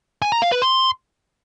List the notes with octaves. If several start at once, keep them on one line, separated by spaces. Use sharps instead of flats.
G#5
A#5
F5
B4
C6